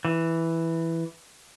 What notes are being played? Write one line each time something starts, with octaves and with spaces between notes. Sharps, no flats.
E3